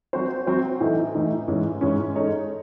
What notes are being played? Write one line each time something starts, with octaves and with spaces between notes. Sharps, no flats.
F#3 C4 F#4 C5
F#3 C4 F#4 C5
A2 E3 A3 D#4
A2 E3 A3 D#4
G#2 E3 G#3 C#4
G#2 E3 G#3 C#4
G#3 D#4 A4 C#5